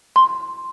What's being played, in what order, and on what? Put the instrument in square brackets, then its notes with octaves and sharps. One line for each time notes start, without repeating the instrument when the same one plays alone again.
[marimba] C6